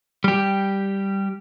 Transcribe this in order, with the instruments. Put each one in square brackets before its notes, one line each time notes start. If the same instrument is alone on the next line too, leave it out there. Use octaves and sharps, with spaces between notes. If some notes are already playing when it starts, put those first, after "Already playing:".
[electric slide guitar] G3 G4